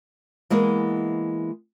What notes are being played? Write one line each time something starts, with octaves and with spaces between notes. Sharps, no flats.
E3 G#3 A#3 B3